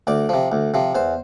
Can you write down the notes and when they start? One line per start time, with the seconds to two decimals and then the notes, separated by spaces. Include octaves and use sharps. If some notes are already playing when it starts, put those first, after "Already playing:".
0.07 D2 D5
0.29 C3 F3
0.52 D2
0.74 C3 F3
0.95 E2 C5